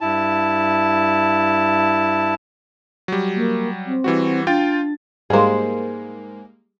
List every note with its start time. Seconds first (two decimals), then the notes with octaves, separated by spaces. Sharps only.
0.01 G2 E4 A5
3.08 F#3 G3
3.36 A#3
3.87 C4
4.04 E3 G3 F#4
4.47 D4 F4 G5 A6
5.30 G#2 G3 G#3 A#3 G#4 C5